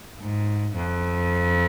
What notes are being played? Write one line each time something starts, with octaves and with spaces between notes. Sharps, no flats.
G#2
F2